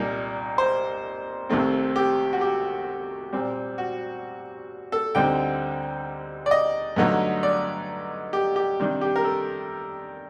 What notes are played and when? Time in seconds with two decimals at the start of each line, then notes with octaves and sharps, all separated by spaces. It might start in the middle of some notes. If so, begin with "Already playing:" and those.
Already playing: C2 A#2 G3 A#3 D#4
0.58 C5
1.50 C2 C3 D#3 A3 C4
1.96 G4
2.33 F#4
2.41 G4
3.33 A#2 G3 C4
3.78 F#4
4.92 A4
5.15 D2 D3 G3 C4 D#4 G5
6.46 D5
6.51 D#5
6.96 G2 D3 F#3 A3 D#4
7.43 D5
8.33 G4
8.56 G4
8.80 C3 D#3 G3 D4
9.01 G4
9.16 A#4
9.24 A4